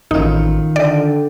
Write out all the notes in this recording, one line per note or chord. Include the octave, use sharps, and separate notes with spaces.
A1 D#3 E3 C#4 D#4 F4
D3 D5 G5